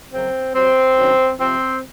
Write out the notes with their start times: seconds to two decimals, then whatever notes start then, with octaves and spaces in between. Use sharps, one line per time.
0.12 F#2 C#3 F#3 C4
0.55 C3 F#3 C4
0.96 F#2 D#3 F#3
1.39 C3 F3 C4